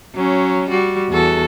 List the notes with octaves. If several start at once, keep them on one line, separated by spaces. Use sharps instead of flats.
F#3 C#4
G3 F#4
E2 F#4 A4